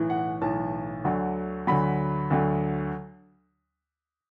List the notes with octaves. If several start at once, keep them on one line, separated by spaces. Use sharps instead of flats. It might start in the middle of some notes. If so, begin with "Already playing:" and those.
Already playing: B1 A2 E3
F#5
B1 A2 E3 A5
D2 D3 F#3
D2 D3 F#3 B5
D2 D3 F#3